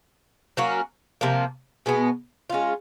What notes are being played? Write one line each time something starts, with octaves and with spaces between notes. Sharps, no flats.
F#3 A#3 C#4 F#4
C3 F3 A#3
B2 G#3 B3
G#3 C#4 F4